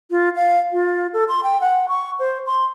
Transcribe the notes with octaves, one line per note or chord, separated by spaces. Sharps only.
F4
F5
F4
A4
C6
G5
F#5
C#6
C5
C6